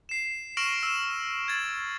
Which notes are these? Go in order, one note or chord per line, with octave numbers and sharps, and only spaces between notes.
C7 E7
C#6 F6 A#6 D7 E7 F#7
E6 E7
G#6 A6